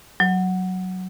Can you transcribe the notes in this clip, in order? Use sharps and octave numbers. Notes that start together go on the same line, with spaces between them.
F#3